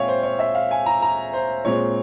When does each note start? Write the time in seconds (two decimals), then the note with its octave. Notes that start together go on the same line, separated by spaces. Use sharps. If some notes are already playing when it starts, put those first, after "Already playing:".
Already playing: A#2 G#3 C4 C#5 E5 F5 G5 G#5
0.08 C5
0.23 C#5
0.39 E5
0.55 F5
0.71 G#5
0.86 A#5
1.02 A#5
1.33 C5
1.65 A#2 G#3 C4 C#5